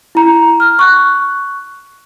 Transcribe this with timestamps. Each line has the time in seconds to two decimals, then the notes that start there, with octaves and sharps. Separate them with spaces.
0.15 E4 A#5
0.60 F6
0.79 C#6 F#6